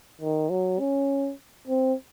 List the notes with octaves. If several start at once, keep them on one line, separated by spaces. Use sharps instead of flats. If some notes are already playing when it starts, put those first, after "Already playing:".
D#3
F#3
C#4
C4